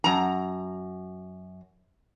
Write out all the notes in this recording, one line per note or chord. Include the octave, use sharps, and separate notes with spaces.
F#2 A#5